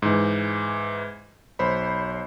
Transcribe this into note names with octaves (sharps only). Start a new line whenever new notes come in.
G#2 E3
B1 C5 C#5 B5